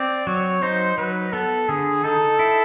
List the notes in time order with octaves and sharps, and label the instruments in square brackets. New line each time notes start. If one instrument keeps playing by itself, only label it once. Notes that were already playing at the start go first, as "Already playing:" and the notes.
Already playing: [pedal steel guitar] C4 [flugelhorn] D5
[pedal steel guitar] F#3 [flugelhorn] C#5
[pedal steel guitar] D#4 [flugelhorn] C5
[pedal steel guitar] F#3 [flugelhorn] B4
[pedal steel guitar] B3 [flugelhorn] A4
[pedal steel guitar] D3 [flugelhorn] G#4
[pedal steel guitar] D#4 [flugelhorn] A4
[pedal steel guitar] E4